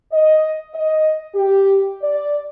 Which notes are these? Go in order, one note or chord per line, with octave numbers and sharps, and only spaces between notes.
D#5
D#5
G4
D5